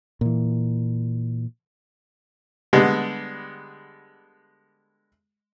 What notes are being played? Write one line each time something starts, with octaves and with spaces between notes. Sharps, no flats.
A#2 E3
D3 G3 G#3 B3